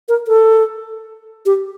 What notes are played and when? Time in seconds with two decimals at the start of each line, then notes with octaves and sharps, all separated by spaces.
0.09 A#4
0.28 A4
1.46 G4